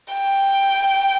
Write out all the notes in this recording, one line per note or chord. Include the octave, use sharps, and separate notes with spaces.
G5